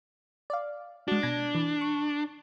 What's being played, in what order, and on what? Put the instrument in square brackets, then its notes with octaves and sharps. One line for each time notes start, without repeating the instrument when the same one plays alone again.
[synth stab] D5 F5
[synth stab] G#3 F#4 [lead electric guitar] D4
[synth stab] B2 G#6 A#6
E3
C#6